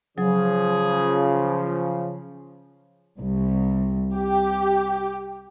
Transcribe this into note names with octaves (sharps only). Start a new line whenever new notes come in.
C#3 F3 F#3 G#4
C2
G4